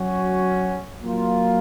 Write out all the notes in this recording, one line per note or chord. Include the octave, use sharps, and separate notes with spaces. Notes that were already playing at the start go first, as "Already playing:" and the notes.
Already playing: F#3 C#4 F#4
F#3 A#3 F4